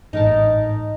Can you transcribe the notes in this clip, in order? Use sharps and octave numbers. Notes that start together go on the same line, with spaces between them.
A1 G#2 D#4 A#4 A5